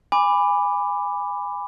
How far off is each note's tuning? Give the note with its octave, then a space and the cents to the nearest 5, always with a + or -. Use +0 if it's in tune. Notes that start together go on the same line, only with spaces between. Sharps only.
G#5 -20 B5 +5 D6 +5